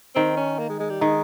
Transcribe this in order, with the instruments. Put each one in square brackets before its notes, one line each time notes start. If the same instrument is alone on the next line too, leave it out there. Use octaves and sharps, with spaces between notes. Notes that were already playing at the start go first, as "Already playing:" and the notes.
[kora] D#3 [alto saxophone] C4
[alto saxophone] C#4
A#3
G#3
G#3
G3
[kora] D#3 [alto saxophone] G#3